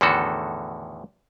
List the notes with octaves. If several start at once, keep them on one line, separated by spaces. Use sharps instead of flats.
E2 A2 D3 D#3 F#4 A4